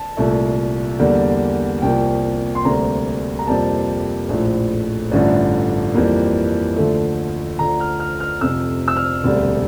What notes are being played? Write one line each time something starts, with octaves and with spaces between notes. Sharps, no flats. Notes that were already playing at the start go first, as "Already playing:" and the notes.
Already playing: A5
C2 A#2 A3
E2 D3 G3 A#3
C2 C3 F3 A#3 G5
C6
D2 C3 G3 A#3 A#5
A#5
F2 C3 G3 A#3 A5
A#1 A2 F3 A3
A1 G2 D3 F3 A3
F2 E3 G3 A#3
D2 D3 F3 A3
D2 D3 F3 A#5
F6
F6
F6
F1 F2 C3 E6
E6
F6
E1 D2 C3 G3